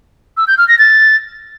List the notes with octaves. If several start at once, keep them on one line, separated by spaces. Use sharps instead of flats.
E6
G6
F6
A#6
A6